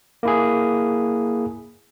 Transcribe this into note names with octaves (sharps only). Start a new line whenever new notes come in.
A#3 E4 G#4